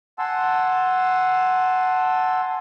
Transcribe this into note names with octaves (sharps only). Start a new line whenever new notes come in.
F#5 G#5 A5 C6 E6